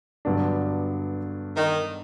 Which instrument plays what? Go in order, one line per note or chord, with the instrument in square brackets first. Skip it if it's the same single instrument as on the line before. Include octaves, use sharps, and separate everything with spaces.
[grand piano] G2 D3 F#3 B3 D4
[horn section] D#3